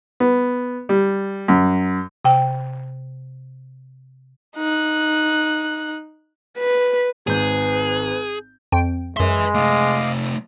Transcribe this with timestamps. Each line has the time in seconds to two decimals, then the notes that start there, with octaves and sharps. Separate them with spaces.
0.20 B3
0.89 G3
1.48 F#2
2.25 C3 G5
4.57 D#4 F#6
6.58 B4
7.27 G#1 G#2 G#4 B4 G6
8.72 F2 G5
9.17 F#2 G#3 B4 E5 C6
9.55 C3 A3 D#5 F5 D6